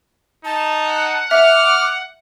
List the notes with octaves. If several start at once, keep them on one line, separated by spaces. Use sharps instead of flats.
D#4 A5
F#5
E5 D6 F6